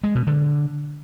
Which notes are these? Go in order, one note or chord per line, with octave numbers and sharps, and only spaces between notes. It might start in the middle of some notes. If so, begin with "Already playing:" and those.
G#3
B2
D3